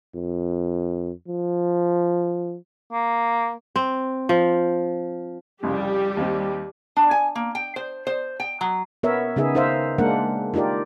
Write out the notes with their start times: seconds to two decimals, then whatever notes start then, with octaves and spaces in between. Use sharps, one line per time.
0.15 F2
1.28 F3
2.92 A#3
3.76 C4
4.29 F3
5.63 C2 F2 C#3 G3 G4
6.17 D#2 C4
6.96 D4
7.11 G#5
7.35 A#3
7.55 G5
7.76 C5
8.07 C5
8.40 G5
8.61 F#3
9.03 B3 A#4 C#5 E5
9.36 C#3 B3 D#4 G#4 E5
9.55 D#4 A#4 C5 E5 F5
9.98 G#3 A#3 D4 A#4 F#5
10.54 D#4 F4 G4 A#4 D5